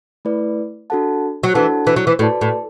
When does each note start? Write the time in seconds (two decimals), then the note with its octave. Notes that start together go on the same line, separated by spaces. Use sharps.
0.25 A3 E4 B4 D5
0.90 D4 F#4 A4 F#5 A5
1.43 F#3
1.55 E3 D4 F#4 A4 F#5 A5
1.87 E3
1.96 F#3
2.07 E3
2.19 A2 F#4 B4 D5 A5
2.41 A2